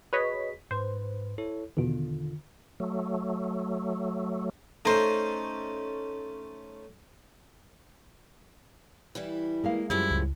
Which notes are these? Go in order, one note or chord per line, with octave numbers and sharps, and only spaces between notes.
F#4 G#4 B4 C#5 D#5 B6
G#2 B4 C5
E4 A4 C#5
E2 B2 D3 D#3 F4
F#3 A3
A3 C#4 D#4 C5
E3 G3 E4
G#3 A#3 F5
F#2 A2 F3 G3 G#3 C#4 E4
C#2